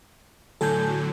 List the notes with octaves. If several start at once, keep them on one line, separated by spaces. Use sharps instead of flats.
A2 D3 F#3 A4 G#5 G6